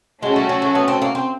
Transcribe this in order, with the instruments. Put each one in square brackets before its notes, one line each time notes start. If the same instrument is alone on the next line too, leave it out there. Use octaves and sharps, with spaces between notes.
[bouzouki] G#3 [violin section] A3 C#4 F#4
[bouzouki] G3
F#3
F#3
B3
C4
A#3
C4